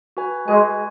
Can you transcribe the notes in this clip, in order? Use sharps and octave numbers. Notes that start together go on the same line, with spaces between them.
F#4 B4 G#5
G#3 F#4 B4 G#5